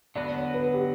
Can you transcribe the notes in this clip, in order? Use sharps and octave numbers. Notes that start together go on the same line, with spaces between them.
D3 F#3 B3 F#4 D5
C#5
B4
G4